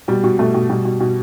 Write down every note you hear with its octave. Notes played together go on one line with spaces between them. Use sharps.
B2 G3
B2
B2 A3
B2
B2 G3
B2
B2